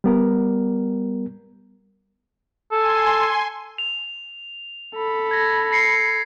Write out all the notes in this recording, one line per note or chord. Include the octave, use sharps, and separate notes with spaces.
G3 B3 A#4
A4 G#5 C6
F7
A4 B5
G#6 A#6
A#6 C7 C#7